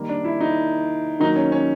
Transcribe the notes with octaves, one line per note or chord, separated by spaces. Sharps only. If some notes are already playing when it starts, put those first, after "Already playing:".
Already playing: D#3 G3 A#3
D4
E4
D#4
D#3 F#3 A#3 D#4
C#4
C#4